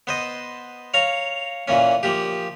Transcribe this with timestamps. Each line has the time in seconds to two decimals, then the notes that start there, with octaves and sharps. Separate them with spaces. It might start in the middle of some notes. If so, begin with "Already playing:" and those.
0.07 B3 C5 D#5
0.94 C#5 F5 A#5
1.68 A#2 E3 A#3 C#4
2.03 F3 A#3 G4